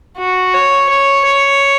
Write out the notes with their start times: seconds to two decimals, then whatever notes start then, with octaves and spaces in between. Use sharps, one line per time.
0.18 F#4
0.54 C#5
0.89 C#5
1.25 C#5